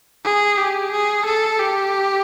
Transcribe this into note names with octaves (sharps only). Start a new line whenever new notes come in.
G#4
G4
G#4
A4
G4